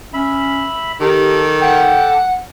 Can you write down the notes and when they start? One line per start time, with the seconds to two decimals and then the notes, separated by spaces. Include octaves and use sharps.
0.14 C#4 E5 B5
1.01 D#3 G4 A4 D6
1.61 F#5 G5